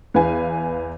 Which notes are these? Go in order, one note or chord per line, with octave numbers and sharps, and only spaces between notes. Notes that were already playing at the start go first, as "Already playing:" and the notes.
E2 B4 F5 G#5